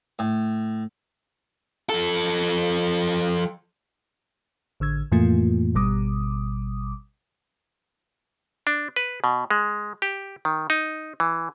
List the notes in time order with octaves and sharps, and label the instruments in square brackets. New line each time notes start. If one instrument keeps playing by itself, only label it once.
[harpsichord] A2
[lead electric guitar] F3 A4
[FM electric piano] A1 D3 E6 G#6
F2 A2 E3 A3 A#3 F4
G#1 B2 G3 D6 D#6
[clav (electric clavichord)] D4
B4
B2
G#3
G4
D#3
D#4
E3